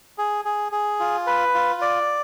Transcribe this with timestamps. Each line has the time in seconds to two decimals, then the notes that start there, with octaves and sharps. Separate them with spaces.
0.18 G#4
0.45 G#4
0.72 G#4
1.00 F4
1.27 B4
1.54 F4
1.81 D5